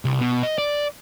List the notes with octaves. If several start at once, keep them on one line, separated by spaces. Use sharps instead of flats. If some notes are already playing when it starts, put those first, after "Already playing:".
C2
B2
D#5
D5